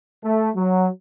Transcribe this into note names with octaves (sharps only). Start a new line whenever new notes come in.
A3
F#3